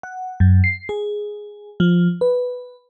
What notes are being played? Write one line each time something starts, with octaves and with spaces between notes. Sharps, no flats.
F#5
F#2
C7
G#4
F3
B4